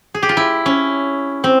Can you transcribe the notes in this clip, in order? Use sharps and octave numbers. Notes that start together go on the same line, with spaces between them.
G#4
G4
F4
E4
C#4
C4